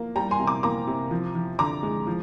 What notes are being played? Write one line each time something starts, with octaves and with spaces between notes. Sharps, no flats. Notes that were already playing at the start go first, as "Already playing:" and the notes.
Already playing: F3 A#3
G3 G5 A#5
G#5 C6
C3
A#5 D6
A#3 A#5 D6
C3
F3
F3
D3 A#5 D6
G#3
F3